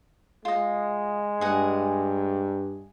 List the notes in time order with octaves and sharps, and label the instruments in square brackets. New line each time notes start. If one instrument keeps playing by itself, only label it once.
[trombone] G#3 [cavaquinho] F4 D#5
[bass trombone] G2 [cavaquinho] G#4 D#5 F#5